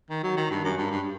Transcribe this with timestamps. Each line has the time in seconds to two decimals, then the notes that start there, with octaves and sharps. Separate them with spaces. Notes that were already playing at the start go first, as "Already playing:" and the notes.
0.10 D#3
0.23 F#3
0.37 D#3
0.50 G2
0.64 F#2
0.77 G2
0.91 G2